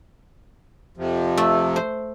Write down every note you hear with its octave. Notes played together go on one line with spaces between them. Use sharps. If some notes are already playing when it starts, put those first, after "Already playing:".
F2 C3 F3
A3
C5